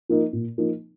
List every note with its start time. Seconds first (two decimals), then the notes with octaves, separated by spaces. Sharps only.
0.09 F3 A#3 D#4
0.33 A#2
0.58 F3 A#3 D#4